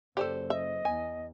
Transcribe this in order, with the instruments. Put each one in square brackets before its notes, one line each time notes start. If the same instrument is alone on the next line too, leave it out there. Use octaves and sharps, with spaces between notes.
[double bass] F#1 [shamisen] G4 [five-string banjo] A4 C5 D5
[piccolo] D#5 [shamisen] E5
[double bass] E2 [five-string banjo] G#5